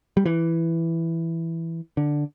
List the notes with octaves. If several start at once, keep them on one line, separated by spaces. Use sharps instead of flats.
G3
E3
D3